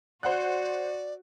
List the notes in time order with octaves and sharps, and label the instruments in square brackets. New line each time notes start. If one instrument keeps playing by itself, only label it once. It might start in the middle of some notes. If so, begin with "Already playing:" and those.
[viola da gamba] F#4 [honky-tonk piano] C5 F#5 F#6 [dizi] D5